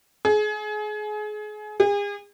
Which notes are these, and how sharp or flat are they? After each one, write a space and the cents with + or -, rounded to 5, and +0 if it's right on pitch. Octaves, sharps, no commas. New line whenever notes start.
G#4 +30
G#4 -40